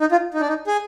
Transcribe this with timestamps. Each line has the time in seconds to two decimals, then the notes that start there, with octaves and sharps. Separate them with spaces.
0.01 D#4
0.12 F4
0.34 D#4
0.41 D4
0.48 D#4
0.67 G#4